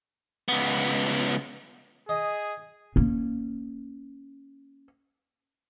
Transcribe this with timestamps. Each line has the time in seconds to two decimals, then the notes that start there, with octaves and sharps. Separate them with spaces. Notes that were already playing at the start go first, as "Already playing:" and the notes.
0.48 C#2 B3
2.09 G#4 D#5
2.96 A#3 C#4